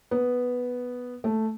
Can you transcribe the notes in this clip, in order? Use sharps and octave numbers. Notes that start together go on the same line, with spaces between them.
B3
A3